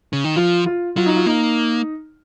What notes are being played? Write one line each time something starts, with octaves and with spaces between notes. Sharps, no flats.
C#3
D#3
F3 F4
F4
F#3 F4
D#4
F4
A#3 D#4